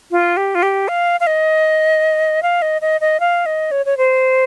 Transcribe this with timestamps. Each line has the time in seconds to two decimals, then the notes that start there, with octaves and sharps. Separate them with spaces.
0.11 F4
0.37 G4
0.55 F4
0.63 G4
0.88 F5
1.20 F5
1.27 D#5
2.43 F5
2.62 D#5
2.82 D#5
3.01 D#5
3.20 F5
3.46 D#5
3.71 C#5
3.86 C#5
3.97 C5